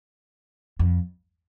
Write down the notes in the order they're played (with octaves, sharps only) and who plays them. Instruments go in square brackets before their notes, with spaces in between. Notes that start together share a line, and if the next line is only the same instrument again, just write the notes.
[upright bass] F2